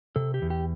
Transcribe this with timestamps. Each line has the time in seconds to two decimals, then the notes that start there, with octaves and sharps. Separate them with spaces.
0.16 C3 A4
0.34 G4
0.42 E2
0.50 G4